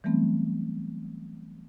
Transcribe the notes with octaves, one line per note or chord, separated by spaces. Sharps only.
E3 F#3 G3 A3 B3 C4